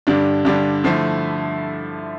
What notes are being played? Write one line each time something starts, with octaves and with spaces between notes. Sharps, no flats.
G2 D3 G3 D4
G2 D3 G3 D4
D3 F3 A3 E4